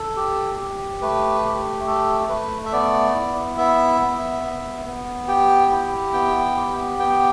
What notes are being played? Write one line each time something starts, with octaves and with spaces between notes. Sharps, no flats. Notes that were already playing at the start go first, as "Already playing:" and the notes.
Already playing: A4
G4
G4
A3 B4
G4
A3 A4
A3 B4
E5
B3 D5
E4
B3 E5
B3
B3
B3
G4 G5
E4
B3 G5
G4
B3 G5